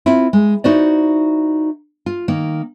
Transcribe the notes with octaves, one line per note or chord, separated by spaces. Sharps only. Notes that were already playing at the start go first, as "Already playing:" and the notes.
C4 E4 F4
G#3
D#4 E4 F#4 C5 D5
F4
D#3 A#3